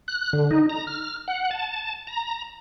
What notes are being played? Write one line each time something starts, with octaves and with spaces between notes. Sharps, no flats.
F#6
D3
D#4
A#5
F6
F#5
A5
A#5